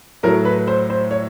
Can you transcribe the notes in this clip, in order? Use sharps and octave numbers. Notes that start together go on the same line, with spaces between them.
A2 F#3 A3 A#4
B4
C5
C5
C#5